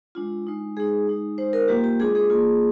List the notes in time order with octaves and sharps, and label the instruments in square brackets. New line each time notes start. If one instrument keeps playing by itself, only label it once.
[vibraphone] G#3 D4 F4
G#3 D#4
G#3 D#4 G#4
G#3 D#4
G#3 D#4 C5
A#4
G3 A#3 F4 G4
G4
G#3 D4 F4 G#4
G#4
A#3 F4